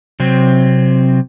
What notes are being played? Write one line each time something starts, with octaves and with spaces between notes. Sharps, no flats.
C3 F#3 C4